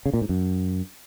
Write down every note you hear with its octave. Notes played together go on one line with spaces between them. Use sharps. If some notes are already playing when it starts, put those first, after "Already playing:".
C#3
A#2
G#2
F#2